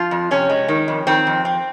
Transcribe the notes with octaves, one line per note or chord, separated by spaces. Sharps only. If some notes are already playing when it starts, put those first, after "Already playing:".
Already playing: F3 F4
F2
C3 C#4
G#3
D#3
F2
D#3 C4
F2
C4